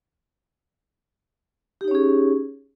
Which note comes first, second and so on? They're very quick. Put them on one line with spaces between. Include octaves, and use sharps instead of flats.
G4 D#4 C#5 C#4 G#4